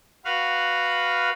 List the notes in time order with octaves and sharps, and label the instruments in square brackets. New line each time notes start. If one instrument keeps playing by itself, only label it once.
[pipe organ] F#4 B4 F5